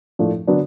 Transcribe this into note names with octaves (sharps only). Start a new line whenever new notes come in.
A2 F3 A3 D4
D3 F#3 B3 D4